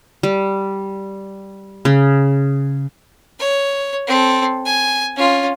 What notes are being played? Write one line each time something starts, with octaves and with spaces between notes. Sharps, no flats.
G3
C#3
C#5
C4 A4
G#5
C#4 F4